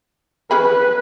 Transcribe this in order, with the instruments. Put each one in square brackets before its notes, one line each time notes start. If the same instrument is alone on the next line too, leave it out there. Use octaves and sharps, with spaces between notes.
[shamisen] C#4 G#4 B5 [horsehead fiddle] B4